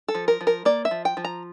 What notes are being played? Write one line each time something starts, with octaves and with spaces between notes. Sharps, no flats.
A4
F3
A#4
F3
A#4
A#3 D5
E5
F3
G5
F3
A#5